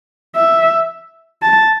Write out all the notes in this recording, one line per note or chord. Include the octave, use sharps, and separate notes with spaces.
E5
A5